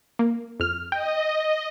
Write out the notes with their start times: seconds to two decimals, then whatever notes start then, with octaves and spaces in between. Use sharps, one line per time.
0.19 A#3
0.60 F2 F6
0.92 D#5 G5